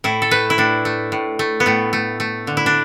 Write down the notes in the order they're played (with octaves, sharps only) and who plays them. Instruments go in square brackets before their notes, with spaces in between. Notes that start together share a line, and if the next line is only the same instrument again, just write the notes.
[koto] A2 E4
A4
A3 B4
E4
A2 D4
A3
A2
A3
B3
A2 A3
A3
A3
D3
E4
D4